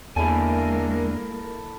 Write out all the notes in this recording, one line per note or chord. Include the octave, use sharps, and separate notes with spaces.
E2 D3 G#3 A#3 E4 A4 A#4 G#5